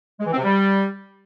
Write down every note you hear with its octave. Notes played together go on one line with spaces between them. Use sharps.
G#3
E3
C4
C3
G3